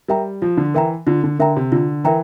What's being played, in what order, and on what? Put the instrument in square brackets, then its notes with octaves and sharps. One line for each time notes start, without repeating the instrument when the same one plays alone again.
[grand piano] G3 [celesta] A#4 E5 G5 A#5
[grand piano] F3 [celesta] F4
[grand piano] D3
[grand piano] E3 [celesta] A#4 E5 G5 A#5
[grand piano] D3 [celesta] F4
[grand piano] D3
[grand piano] D3 [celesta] A#4 E5 G5 A#5
[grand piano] C3
[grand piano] D3 [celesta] F4
[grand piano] E3 [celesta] A#4 E5 G5 A#5